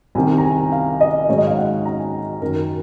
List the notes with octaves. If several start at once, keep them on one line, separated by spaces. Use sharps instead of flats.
C2 C3 D#3 G#5
A#5
G#5
F5
D#5
G#2 D#3 F#3 C#5
D#5
F5
F#5
A#5
G#5
F#2 D#3 F#3 A#4
A#4